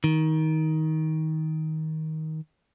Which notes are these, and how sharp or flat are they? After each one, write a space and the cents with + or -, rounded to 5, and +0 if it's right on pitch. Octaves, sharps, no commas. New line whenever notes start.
D#3 +20